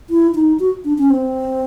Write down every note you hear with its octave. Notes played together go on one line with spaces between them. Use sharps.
E4
D#4
F#4
D4
C#4
C4